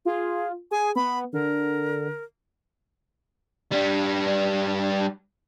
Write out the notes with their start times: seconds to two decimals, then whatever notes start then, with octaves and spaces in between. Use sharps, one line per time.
0.05 F4 G#4
0.71 G#4 G#5
0.96 B3 B5
1.33 D3 A#4
3.71 G3 D4